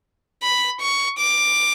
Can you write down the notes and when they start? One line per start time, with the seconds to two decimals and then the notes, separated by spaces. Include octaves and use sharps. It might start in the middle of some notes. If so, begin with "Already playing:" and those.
0.43 B5
0.81 C#6
1.19 D6